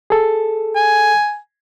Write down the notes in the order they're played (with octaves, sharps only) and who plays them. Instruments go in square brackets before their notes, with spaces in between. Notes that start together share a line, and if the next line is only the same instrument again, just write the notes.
[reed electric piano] G#4 A4
[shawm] G#5